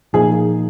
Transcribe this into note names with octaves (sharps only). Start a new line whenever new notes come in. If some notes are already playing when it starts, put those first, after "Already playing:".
A#2 F3 A#3 D#4 G#4